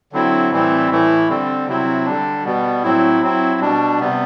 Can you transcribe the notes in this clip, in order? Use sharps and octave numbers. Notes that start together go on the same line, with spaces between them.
D3 F#3 C4 E4
A2 E3 G3 C4 E4
A2 E3 A3 E4
D3 G3 C4
C3 F#3 C4 E4
D3 G3 D4
B2 G3 B3
A2 F#3 C4 E4
F#3 C4 E4
B2 G3 D4
C3 G3 B3